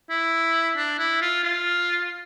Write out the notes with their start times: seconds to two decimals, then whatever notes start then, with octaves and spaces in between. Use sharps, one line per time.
0.10 E4
0.77 D4
0.99 E4
1.22 F4
1.44 F4